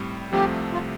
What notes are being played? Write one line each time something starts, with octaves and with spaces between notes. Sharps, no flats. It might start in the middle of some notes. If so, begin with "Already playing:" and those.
Already playing: A2 G3 C4
C2 C3 F3 A3 G4
F4